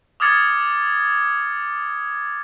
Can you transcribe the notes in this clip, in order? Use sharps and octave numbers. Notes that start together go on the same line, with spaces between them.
D6 D#6 F6 G#6 A6 C#7